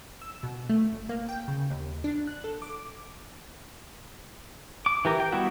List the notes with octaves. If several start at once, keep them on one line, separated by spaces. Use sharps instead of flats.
E6
B2
A3
G1
A#3
G5
C#3
D#2
D4
F#6
A4
D6
D6
E3 G4 A#4
G5
G3 B3 E4 F#4 E5